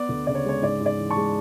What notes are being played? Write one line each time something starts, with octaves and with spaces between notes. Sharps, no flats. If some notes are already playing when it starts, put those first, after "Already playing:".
Already playing: B3 D5
D2
C#3 D5
C#5
G#3 C#5
G#2 D5
G#2
D5
E3
A5 C#6
G#3